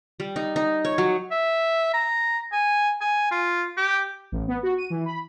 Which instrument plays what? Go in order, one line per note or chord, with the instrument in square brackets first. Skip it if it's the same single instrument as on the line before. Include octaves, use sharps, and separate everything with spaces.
[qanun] G3
D#4
D#4
C#5
F#3
[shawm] E5
A#5
G#5
G#5
F4
G4
[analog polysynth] A1
B3
F#4
D#7
E3
B5